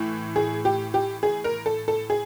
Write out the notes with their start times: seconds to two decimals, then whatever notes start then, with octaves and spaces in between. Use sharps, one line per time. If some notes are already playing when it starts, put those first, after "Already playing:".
Already playing: A2 E3
0.36 G#4
0.65 G4
0.94 G4
1.23 G#4
1.44 A#4
1.66 A4
1.88 A4
2.10 G#4